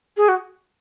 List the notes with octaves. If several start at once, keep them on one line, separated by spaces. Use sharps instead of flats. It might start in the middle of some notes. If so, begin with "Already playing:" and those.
G#4
F#4